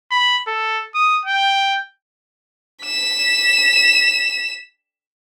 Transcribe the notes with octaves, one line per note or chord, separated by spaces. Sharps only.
B5
A4
D#6
G5
B6 E7